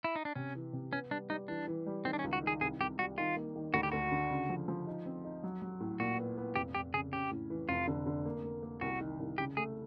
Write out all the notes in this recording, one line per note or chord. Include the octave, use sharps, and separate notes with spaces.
E4
D#4
D4
C3 C#4
E3
C3
B3 C#4
G3 D4
G3 D#4
E3 D4
E3
G3
D#3 C4
D4
C#4
C#2
F#4
D#3
G#4
C2 G#4
C2 G4
G3 F#4
D#3 F4
A#3
D#3
D2 F#4
G4
D2 F#4
D3
C#3
F3
F3
D#4
C4
D#4
F#3
F#3
A2
A#2 F#4
B3
B3
F1 G4
F1 G4
C#3 G#4
C#4 G4
A2
E3
F1 F4
D3
D3
A#3
A#3
A#3
C2 F#4
D#3
C2
C#3 G4
A3 G#4